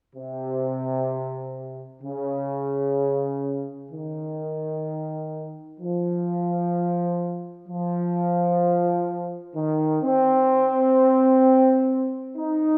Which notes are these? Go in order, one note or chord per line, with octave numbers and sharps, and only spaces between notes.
C3
C#3
D#3
F3
F3
D#3
C4
D#4